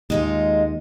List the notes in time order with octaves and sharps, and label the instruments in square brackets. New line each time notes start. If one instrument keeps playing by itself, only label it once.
[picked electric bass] D#2 [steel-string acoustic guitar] G#3 D#4 F4